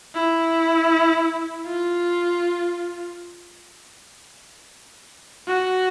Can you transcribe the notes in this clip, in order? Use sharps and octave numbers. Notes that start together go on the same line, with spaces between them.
E4
F4
F#4